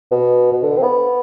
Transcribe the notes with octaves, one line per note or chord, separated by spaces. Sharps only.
B2
B2
D3
C4
B3